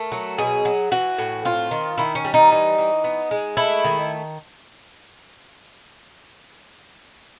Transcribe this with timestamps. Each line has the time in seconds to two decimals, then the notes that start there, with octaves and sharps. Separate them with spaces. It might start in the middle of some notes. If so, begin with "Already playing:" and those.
Already playing: A3 A#4
0.12 F#3
0.38 B2 G#4
0.65 F#3
0.91 E3 F#4
1.18 A2
1.45 C4 F4
1.71 D#3
1.98 D#3 E4
2.15 C#4
2.25 G3
2.34 D#4
2.52 E3
2.78 E3
3.04 B3
3.31 G#3
3.57 A3 E4
3.84 D#3